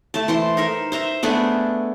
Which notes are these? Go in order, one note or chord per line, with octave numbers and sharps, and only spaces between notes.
A3 A5
E3 C5 C6
D#4 A#4 E5
C5 E5 A#5
A3 B3 D4 G#4